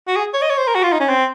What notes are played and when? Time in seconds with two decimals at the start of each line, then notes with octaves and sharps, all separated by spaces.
0.08 F#4
0.16 G#4
0.34 C#5
0.42 D#5
0.50 C#5
0.58 C5
0.68 A#4
0.75 F#4
0.83 F4
0.93 D#4
1.01 C#4
1.09 C4